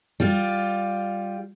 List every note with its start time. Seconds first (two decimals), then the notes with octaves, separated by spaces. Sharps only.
0.20 G3 F4